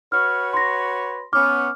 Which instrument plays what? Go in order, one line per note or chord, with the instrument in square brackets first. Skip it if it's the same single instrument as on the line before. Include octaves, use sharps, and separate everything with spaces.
[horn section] F#4 B4 C#5 [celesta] F6
[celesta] C6 A#6
[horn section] B3 C#4 [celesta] D6 F6